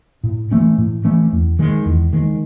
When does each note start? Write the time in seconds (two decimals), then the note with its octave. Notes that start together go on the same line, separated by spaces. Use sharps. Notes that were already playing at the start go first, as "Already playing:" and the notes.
0.24 A2
0.51 E3 A3 C#4
0.78 A2
1.05 E3 A3 C#4
1.32 E2
1.59 D#3 G#3
1.86 E2
2.13 D#3 G#3